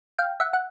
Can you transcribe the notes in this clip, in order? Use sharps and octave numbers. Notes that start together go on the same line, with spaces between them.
F5 G5
E5 F#5
F#5